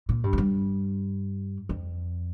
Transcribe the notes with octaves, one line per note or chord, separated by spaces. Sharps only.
A#2
G2
F2
G2
F2